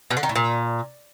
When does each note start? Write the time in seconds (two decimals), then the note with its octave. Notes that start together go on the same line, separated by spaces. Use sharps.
0.10 B2
0.17 D3
0.23 D#3
0.29 A2
0.35 A#2